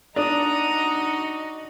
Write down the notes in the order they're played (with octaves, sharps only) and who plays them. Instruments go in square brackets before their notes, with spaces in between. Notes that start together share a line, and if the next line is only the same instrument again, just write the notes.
[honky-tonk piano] D4 [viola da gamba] D#4 F#4 [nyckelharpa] A#5 D#6